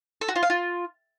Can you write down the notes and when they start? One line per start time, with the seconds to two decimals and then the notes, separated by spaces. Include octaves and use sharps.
0.21 A4
0.28 F#4
0.36 F4
0.43 F5
0.50 F4